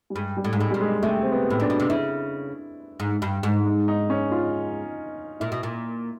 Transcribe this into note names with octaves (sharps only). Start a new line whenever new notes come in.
G3
G2 G#3
G3
A2
G#2
A2 G#3
A#2 G3
G#3
C3 A3
C4
B3
A2
A#2 D4
B2
C3
C#3 E4
G#2
G2
G#2
D#4
D#4
C#4
F4
A#2 E4
B2
A#2